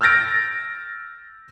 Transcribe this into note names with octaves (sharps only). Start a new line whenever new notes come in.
E6 F6 G6 A6 A#6 D7